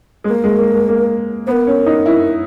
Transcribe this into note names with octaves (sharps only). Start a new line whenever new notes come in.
G#3
A#3 A#4
G#3
A#3
G#3
A#3
B3 A#4 C5
C#4
D#4
E4